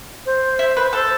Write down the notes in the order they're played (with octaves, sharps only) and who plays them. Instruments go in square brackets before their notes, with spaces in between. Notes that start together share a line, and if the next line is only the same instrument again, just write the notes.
[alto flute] C5
[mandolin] E4
B4
[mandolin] A4 [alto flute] C5